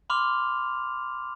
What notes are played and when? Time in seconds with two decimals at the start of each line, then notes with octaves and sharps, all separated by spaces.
0.10 B5 C6 D6 F6 F7